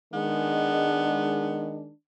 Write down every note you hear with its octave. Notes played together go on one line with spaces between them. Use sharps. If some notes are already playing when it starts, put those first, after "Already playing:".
D#3 G#3 B3 D4